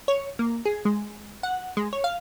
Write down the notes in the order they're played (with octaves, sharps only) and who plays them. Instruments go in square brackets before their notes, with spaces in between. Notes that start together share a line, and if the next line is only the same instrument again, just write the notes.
[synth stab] C#5
A#3
G#4
G#3
F#5
G#3
C#5
F5